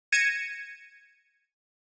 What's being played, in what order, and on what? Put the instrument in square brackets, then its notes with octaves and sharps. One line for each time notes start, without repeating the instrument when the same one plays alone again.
[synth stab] G#6 A#6 C#7 D#7 E7